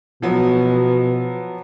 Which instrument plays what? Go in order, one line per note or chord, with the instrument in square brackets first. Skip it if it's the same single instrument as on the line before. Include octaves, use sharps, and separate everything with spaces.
[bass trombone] B2 [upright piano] F3 F#3 B3